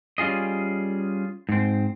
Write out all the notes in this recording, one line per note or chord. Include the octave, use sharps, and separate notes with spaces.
G3 C#4 F4 G#4 D#5
G#2 C4